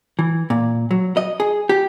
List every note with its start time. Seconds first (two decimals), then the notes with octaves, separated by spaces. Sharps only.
0.19 E3
0.50 A#2
0.91 F#3
1.17 D#5
1.40 G#4
1.69 G4